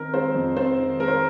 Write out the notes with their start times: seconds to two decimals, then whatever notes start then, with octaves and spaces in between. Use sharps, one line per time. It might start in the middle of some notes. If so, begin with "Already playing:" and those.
Already playing: D#3 C4 A#4
0.14 G#3 C4 C5
0.35 F2
0.56 C4 C5
0.79 D#3
0.99 G#3 A#4
1.08 C5